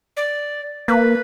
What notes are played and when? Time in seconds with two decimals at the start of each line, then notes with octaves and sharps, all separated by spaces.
0.17 D5
0.88 A#3 B4